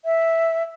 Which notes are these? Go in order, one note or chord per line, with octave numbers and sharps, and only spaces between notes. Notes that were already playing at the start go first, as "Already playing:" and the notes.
E5